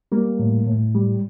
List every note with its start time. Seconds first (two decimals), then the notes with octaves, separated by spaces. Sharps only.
0.12 G3 A#3
0.39 A2
0.67 A2
0.95 G3